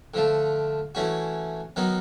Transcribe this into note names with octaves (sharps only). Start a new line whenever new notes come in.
D3 F3 A3
E3 A3 C#4 F#4
D#3 F#3 B3 D#4